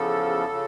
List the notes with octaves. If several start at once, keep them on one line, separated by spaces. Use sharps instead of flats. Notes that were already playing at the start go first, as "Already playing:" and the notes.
Already playing: E2 C#3 F3 A4
C#3 F3